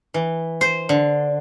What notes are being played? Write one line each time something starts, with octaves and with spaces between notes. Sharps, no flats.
E3
C5
D3